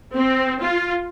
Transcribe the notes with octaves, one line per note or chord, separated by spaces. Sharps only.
C4
F4